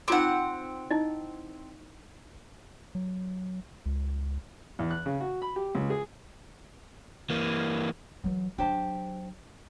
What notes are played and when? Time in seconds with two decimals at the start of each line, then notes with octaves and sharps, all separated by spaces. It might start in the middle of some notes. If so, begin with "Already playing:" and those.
0.08 C4 D#4 F4 F#5 D6
0.91 D#4 E4 D#5
2.95 F#3
3.86 C#2
4.79 E2
4.91 F#6
5.06 C#3
5.20 F#4
5.42 B5
5.56 G4
5.75 C#2
5.90 G#4
7.30 E3 A#3
8.24 E3 F#3
8.58 F#3 D4 G4 C5 A5